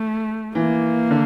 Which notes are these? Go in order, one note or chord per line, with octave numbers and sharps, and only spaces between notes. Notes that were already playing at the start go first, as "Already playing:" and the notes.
Already playing: A3
E3 A#3
D3